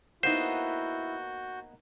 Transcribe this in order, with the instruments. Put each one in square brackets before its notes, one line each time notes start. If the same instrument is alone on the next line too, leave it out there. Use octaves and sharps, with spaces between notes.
[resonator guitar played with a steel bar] A#3 B3 D#4 [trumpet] E4 [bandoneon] F#4 G6 [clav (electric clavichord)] C5